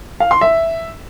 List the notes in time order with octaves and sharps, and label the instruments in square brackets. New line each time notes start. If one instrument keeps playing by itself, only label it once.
[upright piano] F5
C6
E5